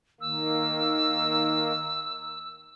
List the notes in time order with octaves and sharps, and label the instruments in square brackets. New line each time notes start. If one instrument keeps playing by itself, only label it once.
[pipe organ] D#3 A#3 [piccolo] E6